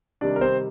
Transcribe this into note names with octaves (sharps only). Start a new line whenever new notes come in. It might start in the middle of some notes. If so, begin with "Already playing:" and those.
C3 D#3 G3 D4 D5
A#4
C4 C5